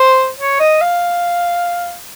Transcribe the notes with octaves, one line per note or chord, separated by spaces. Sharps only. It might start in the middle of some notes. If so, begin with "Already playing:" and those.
Already playing: C5
C#5
D#5
F5